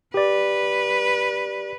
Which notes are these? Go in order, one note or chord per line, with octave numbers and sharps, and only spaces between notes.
G4 B4 D5